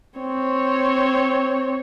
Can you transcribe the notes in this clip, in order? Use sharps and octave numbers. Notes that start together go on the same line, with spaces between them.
C4 C#5